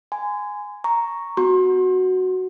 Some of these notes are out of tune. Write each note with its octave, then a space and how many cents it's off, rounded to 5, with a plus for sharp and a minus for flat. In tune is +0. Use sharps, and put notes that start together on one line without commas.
G#5 +0 C6 -35
A#5 +0 C#6 +0
B3 +35 F#4 +0 C6 +30